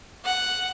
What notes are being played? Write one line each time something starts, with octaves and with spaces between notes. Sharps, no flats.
F#5